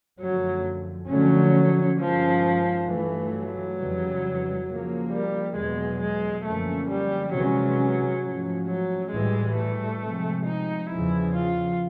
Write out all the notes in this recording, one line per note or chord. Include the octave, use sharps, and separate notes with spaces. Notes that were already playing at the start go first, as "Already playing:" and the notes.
F#2 D3 F3 F#3 A3
D3 F3 F#3 A3 C#4
G2 D#3 F3 G#3 C#4
G2 E3 A3
F#3
F2 C#3 E3 G3
C#3 F3 A#3
G3
E2 B2 F#3 G#3
G#3
F#2 D3 F3 A3 A#3 C#4
G3
C3 E3 F#3 G#3 C#4
G#2 F3 A3 C#4
F#3
A2 E3 G3 G#3
A3
C3 F3 G#3 C4
D#4
E2 C#3 F3 E4
F4